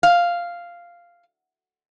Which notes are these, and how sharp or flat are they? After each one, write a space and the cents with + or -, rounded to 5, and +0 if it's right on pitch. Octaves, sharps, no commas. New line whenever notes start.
F5 -5